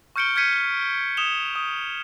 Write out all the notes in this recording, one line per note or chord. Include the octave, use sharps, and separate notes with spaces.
C#6 F6 G6 C#7 D7 G7
F6 G6 G#6 B6 C#7 D#7
D#6 E7 F7 G7
D#6